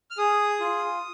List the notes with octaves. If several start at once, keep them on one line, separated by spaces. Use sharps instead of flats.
F6
G#4 D#6
F4